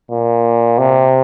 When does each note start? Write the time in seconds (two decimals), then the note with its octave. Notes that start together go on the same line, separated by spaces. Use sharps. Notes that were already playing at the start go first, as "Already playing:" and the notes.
0.10 A#2
0.78 C3